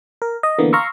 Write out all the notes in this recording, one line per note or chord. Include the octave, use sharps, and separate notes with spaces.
A#4
D#5
D3 E3 A#3 B3
F5 A#5 C6 C#6 E6